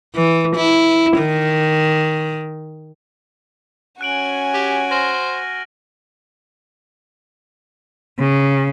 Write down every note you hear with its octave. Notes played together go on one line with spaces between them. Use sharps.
E3
E4
D#3
C#4 F#4 G#5 F#6 D7 F#7
G4
C5 F6 A#6 F#7
C#3